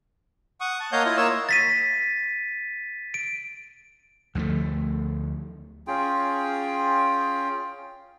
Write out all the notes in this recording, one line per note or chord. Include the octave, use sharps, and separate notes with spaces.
F#5 C#6 D#6
A5
A#3 C#5 D#5 F5 F#5 G6
E4 F4 D#5
A#3 C#5 E6
A6 B6 D#7
D7
D2 F3 G#3 A3
C#4 F4 G#4 G5